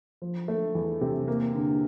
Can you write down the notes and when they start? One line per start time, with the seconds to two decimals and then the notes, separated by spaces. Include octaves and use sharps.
0.22 F3
0.48 A3
0.75 E2
1.01 C3
1.28 A#3
1.54 D3